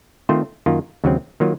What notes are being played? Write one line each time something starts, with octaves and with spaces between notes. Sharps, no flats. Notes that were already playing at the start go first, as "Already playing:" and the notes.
D#3 A3 C4 F4 C5
F#2 D#3 A#3 F4
D#2 C#3 F#3 C4
D#3 F#3 A#3 F4